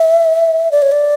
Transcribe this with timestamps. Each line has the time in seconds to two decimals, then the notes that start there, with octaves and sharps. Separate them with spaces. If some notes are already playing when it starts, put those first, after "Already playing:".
Already playing: E5
0.72 D5
0.82 C#5
0.92 D5